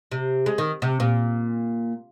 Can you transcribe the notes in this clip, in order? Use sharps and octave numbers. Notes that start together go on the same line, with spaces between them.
C3
G#3
D#3
C3
A#2